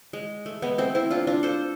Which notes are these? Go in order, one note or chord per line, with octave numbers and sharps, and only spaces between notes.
G#3
A3
G#3 B3
A3 C4
C4 E4
D4 F4
D4 F4
A4 C5